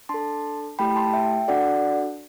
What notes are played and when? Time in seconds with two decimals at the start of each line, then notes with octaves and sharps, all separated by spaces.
0.09 D4 A4 A5 C6
0.79 A3 E4 G4 G5 B5
0.96 A5 C6
1.13 E5 G5
1.48 D4 F#4 A4 D5 F#5